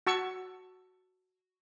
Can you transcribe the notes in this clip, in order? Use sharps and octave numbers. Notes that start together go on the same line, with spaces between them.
F#4 A5 C#6 E6